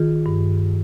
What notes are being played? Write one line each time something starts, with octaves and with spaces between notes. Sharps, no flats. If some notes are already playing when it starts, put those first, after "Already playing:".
Already playing: D#3 F4 G#4
G2